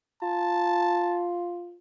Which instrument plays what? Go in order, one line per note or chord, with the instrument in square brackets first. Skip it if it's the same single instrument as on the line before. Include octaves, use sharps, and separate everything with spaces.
[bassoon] F4 [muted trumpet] A5